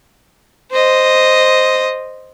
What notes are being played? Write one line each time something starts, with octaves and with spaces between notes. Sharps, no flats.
C5 D#5